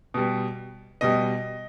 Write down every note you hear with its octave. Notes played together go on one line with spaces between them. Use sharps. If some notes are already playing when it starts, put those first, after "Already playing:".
B2 G3
B2 G3 D#5